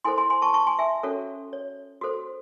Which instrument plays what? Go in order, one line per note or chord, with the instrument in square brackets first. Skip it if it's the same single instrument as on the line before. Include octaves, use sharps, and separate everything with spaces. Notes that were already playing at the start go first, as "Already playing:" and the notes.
[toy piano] E4 A4 C5 G#5 C6
G#5 C6
G#5 C6
A5 C#6
A5 C#6
G#5 C6
E5 G#5
C#4 F#4 A4 C#5
C#5
F#4 A4 C5